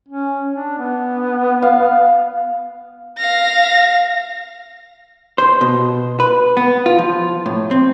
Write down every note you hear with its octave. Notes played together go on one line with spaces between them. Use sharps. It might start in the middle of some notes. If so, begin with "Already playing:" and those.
C#4
D4
B3
F5
F5 A#6
C5
B2
B4
B3
F4
F3
A2
C4